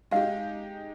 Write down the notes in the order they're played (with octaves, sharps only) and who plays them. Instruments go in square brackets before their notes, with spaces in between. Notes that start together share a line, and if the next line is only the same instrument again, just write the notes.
[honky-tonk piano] G#3 D#4 G4 [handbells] F5